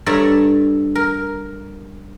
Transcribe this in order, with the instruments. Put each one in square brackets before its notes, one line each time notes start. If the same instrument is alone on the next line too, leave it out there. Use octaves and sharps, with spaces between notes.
[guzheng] G2 A4 C#5 D5 E5 A#5
A#4